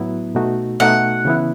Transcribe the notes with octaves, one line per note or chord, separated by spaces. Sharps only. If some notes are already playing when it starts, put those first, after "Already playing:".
Already playing: A2 F#3 B3 E4
B2 A3 D#4 F#4
B2 A3 D#4 F#4 F#5
C#3 E3 B3 E4